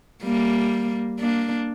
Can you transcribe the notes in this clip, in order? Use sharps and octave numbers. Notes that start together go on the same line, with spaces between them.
G3 A#3
A#3 D4